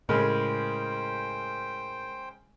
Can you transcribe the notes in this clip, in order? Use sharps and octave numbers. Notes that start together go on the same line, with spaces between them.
A2 C#3 G#3 A#4 C5 G5 B5 F6